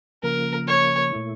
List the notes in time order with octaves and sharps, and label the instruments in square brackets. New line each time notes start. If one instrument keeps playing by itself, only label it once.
[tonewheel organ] C#3 F3 A#3 [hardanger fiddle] A#4
[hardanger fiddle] C#5
[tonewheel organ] A#2 A3 E4